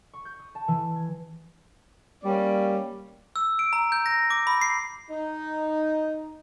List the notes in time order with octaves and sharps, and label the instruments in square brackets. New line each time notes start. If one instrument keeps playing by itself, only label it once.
[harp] C#6
G6
D#6
A5
E3
G#6
[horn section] G3 A#3 C#4 D5
[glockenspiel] E6
D7
A#5
G6
A#6
D6
B5
C7
[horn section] D#4